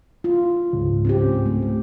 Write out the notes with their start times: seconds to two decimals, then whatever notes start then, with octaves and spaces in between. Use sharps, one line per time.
0.24 F4
0.73 C#2 G#2
1.05 C4 C#4 G4
1.46 A3